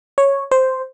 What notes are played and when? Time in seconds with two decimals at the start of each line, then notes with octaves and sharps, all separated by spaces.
0.18 C#5
0.51 C5